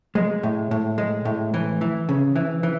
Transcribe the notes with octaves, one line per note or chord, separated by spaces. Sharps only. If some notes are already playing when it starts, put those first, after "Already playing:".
G#3
A2
A2
G#3
A2
E3
E3
C#3
E3
E3